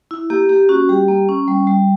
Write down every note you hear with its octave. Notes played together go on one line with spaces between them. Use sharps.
E4
A#3 G4
A#3 G4
C#4 F#4
G3 G4
A#3
C#4
G3
G3